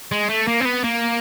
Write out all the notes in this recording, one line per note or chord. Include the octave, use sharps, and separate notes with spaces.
G#3
A3
A#3
C4
B3
A#3